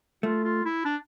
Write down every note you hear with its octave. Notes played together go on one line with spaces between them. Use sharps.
A3 F4
F4
E4
D4